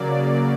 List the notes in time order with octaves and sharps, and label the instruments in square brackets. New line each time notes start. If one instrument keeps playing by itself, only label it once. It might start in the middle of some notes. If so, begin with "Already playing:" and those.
Already playing: [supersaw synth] C#3 F#3 A#3 D5